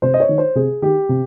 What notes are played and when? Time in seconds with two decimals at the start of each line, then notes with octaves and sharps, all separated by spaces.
0.02 C3 C5
0.14 D#5
0.20 C#5
0.29 D#3
0.38 C5
0.55 C3 G#4
0.82 D#3 G4
1.09 C3